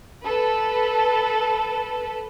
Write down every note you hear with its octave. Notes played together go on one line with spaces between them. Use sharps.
A4 B4